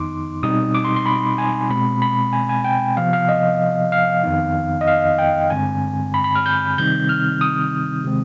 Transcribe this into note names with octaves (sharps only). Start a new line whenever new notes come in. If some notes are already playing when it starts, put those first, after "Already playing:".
Already playing: F2 D#3 B3 D#4 C6 D6
B2 G3 C4 D#4 D#6
D6
C6
C6
B5
G#5
B2 G#3 C4 B5
B5
G#5
G#5
G5
C3 F3 B3 F5
F5
D#5
F5
F2 D#3 B3 D#4
D#5
F5
G5
G2 D3 G#3 C4 G#5
B5
B5
F6
G6
C3 D#3 G3 C4 D#4 G6
F6
D#6
C3 D#3 G#3 C4